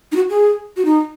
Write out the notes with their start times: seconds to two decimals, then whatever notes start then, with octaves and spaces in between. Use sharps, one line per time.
0.12 D#4
0.16 F#4
0.30 G#4
0.77 F#4
0.85 D#4